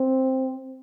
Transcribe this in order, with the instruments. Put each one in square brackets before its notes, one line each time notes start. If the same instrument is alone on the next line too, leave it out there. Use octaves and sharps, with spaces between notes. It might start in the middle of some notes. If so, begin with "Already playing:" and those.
Already playing: [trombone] C4